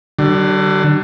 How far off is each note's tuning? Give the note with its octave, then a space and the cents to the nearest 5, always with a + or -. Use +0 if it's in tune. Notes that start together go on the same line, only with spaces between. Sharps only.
D3 +25 G3 -45